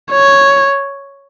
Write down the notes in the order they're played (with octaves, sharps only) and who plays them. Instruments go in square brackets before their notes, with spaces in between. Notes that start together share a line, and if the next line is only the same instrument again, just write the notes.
[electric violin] C#5